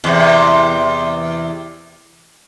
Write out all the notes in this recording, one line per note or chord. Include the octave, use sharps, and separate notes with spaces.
E2 C3